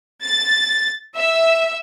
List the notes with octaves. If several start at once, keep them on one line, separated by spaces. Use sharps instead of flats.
A6
E5